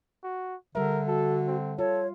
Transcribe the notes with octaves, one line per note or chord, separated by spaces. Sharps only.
F#4
D3 G3 A#4 E5
F#4 A4
C4
F4 A4 C#5